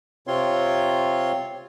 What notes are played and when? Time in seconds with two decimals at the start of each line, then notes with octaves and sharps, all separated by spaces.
0.27 C3 C4 F4 C#5 C6